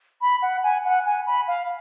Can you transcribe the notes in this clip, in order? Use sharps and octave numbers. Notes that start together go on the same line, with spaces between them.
B5
F#5
G#5
F#5
G#5
B5
F5